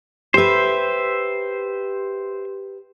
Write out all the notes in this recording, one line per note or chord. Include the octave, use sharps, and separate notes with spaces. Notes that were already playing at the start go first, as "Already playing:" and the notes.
G4 B4 C5 E5